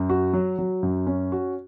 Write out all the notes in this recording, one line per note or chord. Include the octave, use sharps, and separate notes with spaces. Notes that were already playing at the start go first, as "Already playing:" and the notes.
Already playing: F#2
F#4
F#3
F#3
F#2
C#4
F#4